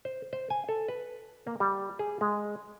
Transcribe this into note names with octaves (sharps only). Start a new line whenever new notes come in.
C5
C5
G#5
A4
B4
A#3
G3
G#4
G#3